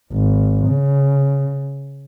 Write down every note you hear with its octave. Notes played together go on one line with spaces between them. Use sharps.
G#1
C#3